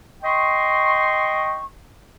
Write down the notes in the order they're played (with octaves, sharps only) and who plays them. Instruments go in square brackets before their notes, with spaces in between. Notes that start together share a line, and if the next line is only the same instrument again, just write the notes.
[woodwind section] D#5 G5 C6 C#6